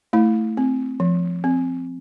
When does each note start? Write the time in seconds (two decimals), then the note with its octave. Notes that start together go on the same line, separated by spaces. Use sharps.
0.13 A3 E4
0.57 C4
1.00 F3
1.44 C4